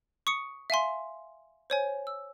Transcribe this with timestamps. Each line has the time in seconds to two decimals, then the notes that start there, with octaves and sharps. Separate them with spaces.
0.27 C#6 D#6 C#7
0.70 E5 F5 G#5 C6
1.70 C5 C#5 G#5
2.07 E6